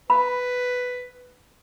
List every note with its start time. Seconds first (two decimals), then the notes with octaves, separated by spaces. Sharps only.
0.10 B4 B5